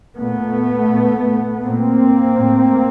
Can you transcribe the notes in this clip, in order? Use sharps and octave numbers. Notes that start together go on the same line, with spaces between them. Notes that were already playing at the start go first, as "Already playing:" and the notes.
A#2 A3 B3
A#2
A#2 A#3 C4
A2